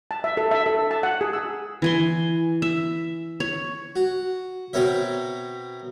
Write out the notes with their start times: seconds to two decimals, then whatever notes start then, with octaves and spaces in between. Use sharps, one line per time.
0.11 A5
0.24 E5
0.37 A4
0.51 E5
0.66 A4
0.91 A5
1.03 F#5
1.21 G#4
1.33 E6
1.82 E3 G#5 C6
2.62 E5
3.40 C#5
3.96 F#4
4.73 B2 C4 A#4 C#5 E5